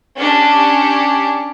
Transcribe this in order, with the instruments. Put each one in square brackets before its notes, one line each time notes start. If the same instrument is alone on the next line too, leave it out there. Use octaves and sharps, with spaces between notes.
[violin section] C#4 D4 G4